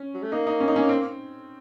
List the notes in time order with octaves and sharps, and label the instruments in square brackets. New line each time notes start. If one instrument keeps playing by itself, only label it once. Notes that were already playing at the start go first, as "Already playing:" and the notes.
Already playing: [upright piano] C#4
[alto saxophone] F#3
A3
[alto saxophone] A#3 [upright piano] D#4
[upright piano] D#4
C#4
D#4
C#4
C4